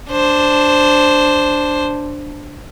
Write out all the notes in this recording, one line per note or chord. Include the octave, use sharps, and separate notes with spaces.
D4 C5